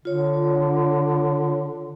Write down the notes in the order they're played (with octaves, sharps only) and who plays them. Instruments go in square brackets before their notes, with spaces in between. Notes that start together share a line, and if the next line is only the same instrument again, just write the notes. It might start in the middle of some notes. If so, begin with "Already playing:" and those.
[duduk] D3 [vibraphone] F4 C#5